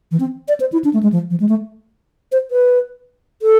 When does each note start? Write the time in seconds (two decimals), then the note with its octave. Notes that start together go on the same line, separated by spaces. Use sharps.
0.11 E3
0.20 C4
0.48 D5
0.60 C5
0.72 E4
0.84 D4
0.93 A3
1.03 G#3
1.12 F3
1.30 F3
1.40 G#3
1.49 A3
2.32 C5
2.51 B4
3.42 A4